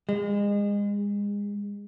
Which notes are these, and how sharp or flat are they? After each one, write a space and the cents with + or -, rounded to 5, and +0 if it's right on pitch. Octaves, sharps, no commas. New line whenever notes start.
G#3 -30